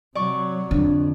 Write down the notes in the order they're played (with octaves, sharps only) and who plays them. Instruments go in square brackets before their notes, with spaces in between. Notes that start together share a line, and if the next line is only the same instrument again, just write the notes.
[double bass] C3 F#3 [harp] D5 C#6
[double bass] F2 [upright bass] D3